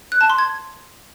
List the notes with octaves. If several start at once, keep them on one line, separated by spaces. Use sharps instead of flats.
F#6
A5
C6
G#6